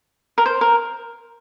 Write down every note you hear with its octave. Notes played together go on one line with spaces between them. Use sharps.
A#4
C5
A#4